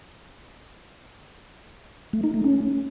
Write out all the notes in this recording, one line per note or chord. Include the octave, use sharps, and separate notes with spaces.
A3
D#4
A3
C#4